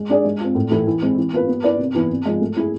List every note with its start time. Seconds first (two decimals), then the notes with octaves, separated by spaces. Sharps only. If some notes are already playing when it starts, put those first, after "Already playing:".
Already playing: G#3
0.09 D4 G#4 D5
0.25 G#3
0.40 C4 F4
0.55 A2
0.70 E3 A3 E4 A4
0.87 E3
1.02 G#3 C4
1.17 E3
1.33 B3 F4 B4
1.48 B3
1.63 E4 B4 D5
1.79 C3
1.95 E3 B3 E4
2.10 C3
2.26 F3 G#3
2.41 A3
2.56 E4 G#4